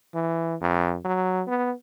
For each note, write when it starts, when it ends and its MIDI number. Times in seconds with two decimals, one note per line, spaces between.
0.14 0.55 52
0.61 0.97 41
1.05 1.42 54
1.47 1.72 59